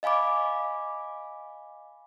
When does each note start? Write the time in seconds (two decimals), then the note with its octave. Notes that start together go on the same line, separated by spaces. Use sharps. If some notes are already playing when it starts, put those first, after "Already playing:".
0.03 D#5 F5 G#5 B5 D6